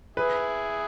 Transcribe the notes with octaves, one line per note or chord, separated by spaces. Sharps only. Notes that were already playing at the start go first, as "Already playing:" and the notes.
E4 G#4 B4